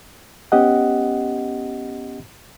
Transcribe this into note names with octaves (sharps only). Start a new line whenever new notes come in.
B3 C#4 G4 D#5 F#5